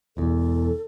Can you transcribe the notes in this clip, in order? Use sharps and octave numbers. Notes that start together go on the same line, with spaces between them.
E1 E2 A4